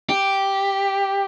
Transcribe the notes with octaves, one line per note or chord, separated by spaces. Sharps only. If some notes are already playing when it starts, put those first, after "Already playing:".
G4